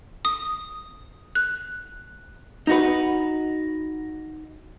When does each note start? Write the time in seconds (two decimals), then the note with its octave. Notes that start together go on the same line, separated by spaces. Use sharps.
0.25 D#6
1.35 F#6
2.67 D#4 F#4 B4